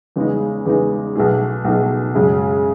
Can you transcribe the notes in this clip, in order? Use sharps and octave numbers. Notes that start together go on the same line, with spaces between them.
E2 C#3 G#3 B3 D#4
E2 C#3 G#3 B3 D#4
B1 B2 A3 D#4 G#4
B1 B2 A3 D#4 G#4
F#2 C#3 G#3 C#4